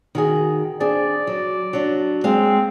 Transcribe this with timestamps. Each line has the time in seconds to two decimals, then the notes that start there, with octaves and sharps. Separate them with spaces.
0.15 D#3 F#4 G#4
0.80 C4 D4 G#4 D5
1.27 F#3
1.73 F#3 D4
2.24 G#3 C4 C5 F5